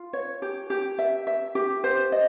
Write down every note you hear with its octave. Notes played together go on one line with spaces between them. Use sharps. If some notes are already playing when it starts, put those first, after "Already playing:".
Already playing: F4
C#5
G4
G4
E5
E5
G4
C5
D#5